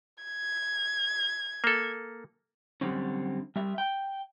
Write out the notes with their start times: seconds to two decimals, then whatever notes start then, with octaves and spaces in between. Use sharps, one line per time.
0.24 G#6
1.64 A#3 A4
2.81 D3 F#3 G3 C4 C#4
3.56 G3 E5
3.78 G5